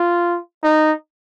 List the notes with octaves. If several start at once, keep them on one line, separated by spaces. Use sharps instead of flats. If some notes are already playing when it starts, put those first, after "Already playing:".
Already playing: F4
D#4